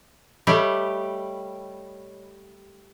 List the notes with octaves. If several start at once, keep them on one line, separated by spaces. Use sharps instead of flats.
G3 A3 G4 C#5 D#5 B5